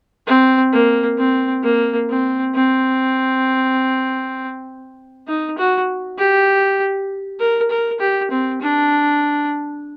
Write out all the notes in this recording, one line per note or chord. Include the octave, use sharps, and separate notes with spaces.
C4
A#3
C4
A#3
C4
C4
D#4
F#4
G4
A#4
A#4
G4
C4
D4